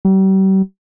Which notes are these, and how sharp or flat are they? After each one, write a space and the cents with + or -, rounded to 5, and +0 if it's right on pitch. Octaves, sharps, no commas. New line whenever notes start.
G3 -40